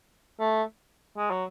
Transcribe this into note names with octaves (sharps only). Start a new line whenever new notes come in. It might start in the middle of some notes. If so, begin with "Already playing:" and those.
A3
G#3
F#3